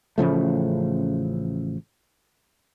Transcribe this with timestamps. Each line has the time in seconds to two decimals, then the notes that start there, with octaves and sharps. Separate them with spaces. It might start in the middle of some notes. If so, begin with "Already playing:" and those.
0.18 A1 C#3 F3 A3